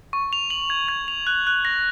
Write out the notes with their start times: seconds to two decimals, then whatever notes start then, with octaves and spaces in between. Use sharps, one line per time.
0.13 C#6
0.33 F7
0.50 F#7
0.70 G#6
0.89 G#6
1.08 F7
1.27 F#6
1.47 F#6
1.65 A#6